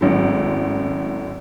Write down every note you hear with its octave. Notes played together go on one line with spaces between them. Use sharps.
G#1 F#2 A2